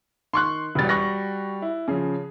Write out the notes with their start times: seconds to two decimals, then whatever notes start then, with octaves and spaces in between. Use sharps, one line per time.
0.33 D#3 C6 C#6 F#6
0.75 E1 G3 F#4 A6
0.89 C#6 F#6 A#6
1.62 E4
1.88 C#3 F3 G#4